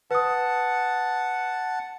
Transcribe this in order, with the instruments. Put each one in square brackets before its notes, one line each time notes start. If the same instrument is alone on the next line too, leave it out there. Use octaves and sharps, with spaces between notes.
[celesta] B4 D#6 [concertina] F#5 A5